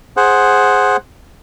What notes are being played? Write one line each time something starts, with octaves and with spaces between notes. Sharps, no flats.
G#4 C5 F#5